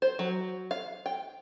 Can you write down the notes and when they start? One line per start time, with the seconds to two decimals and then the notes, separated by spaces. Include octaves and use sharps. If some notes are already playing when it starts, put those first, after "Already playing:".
0.02 C5
0.19 F#3
0.71 F5
1.06 G5